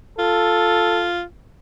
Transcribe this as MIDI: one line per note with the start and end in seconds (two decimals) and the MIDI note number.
0.19 1.23 65
0.19 1.09 69